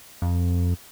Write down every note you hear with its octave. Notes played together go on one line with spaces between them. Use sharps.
F2